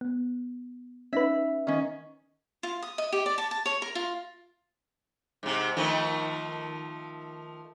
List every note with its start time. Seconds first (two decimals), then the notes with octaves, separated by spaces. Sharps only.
0.01 B3
1.13 C#4 D#4 B4 E5
1.67 D#3 C#4
2.63 F4
2.82 D#6
2.98 D#5
3.12 G4
3.26 D5
3.38 A5
3.51 A5
3.66 C#5
3.82 A#4
3.95 F4
5.43 G#2 C3
5.77 D#3 F3 A3